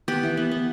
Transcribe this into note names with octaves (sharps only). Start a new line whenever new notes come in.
B3 G4
E3
B3
B3